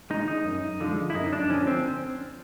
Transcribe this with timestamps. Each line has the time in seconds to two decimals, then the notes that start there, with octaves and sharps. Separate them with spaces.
0.10 G#3 D#4
0.28 D#4
0.45 F#2
0.80 D3 F3 G#3
1.10 E4
1.15 F#2 D#4
1.33 D4
1.49 D3 F3 C#4
1.67 C4